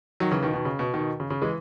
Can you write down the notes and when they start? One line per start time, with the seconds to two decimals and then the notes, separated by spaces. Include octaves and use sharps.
0.20 D#3 F#3
0.31 C#3 E3
0.42 B2 D#3
0.54 B2 D#3
0.65 C#3
0.79 B2
0.94 B2 D#3
1.20 C#3
1.30 C#3
1.42 E3 G#3